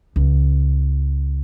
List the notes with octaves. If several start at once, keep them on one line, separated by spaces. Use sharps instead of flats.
C#2